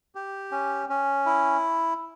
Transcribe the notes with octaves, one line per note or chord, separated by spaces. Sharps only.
G4
C#4
C#4
E4